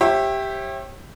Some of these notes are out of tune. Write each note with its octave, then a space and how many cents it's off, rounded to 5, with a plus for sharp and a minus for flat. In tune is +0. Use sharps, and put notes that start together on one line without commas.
G4 +0 C#5 -40 E5 +0